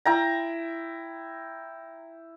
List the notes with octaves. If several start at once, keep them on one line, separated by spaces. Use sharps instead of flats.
E4 G5 A#5